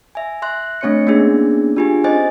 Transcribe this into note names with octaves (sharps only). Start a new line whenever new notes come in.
E5 G#5
E5 C6 F#6
A3 C4 D4 C#5 C6 C#7
A#3 B3 C#4 D4 E4 G#4
D4 F4 G4 G#4 G#5
C4 C#4 C5 D#5 G#5 A6